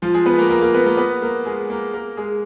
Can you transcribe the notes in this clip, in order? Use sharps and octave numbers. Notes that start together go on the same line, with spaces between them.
F3 F4
G#3 G#4
B3 B4
A#3 A#4
A#3 A#4
A#3 A#4
B3 B4
A#3 A#4
B3 B4
A#3 A#4
G#3 G#4
A#3 A#4
A#3 A#4
G#3 G#4